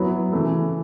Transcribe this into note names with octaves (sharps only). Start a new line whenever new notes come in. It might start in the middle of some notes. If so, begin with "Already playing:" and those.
Already playing: F#3 B3 E4
C#3 E3 A3